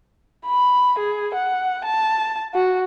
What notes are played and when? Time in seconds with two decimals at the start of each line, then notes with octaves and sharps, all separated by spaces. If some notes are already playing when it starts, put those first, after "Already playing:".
0.46 B5
0.98 G#4
1.35 F#5
1.85 A5
2.54 F#4